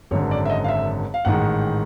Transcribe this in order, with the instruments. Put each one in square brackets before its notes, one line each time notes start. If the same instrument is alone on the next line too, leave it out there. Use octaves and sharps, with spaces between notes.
[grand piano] G#1 F#2 D3 C#5
D5
E5
D#5
F5
E5
F5
A1 G#2 D#3 F#5